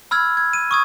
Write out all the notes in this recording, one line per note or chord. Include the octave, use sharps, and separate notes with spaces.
B5 E6 F6 G#6
G#6
D#7
C#6 D#6 G#6